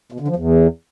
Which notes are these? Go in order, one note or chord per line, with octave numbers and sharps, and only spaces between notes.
B2
D3
F3
E2